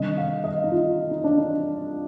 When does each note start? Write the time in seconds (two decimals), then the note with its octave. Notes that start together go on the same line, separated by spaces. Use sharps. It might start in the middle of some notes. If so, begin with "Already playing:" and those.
Already playing: C3 D#3 G3 D4 D#5
0.18 F5
0.44 D#5
0.64 D#4
0.72 F4
1.11 D#4
1.24 D4
1.37 D#4